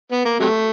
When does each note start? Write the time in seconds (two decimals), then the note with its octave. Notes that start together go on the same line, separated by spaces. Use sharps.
0.12 B3
0.25 A#3
0.40 C3 F#3 A3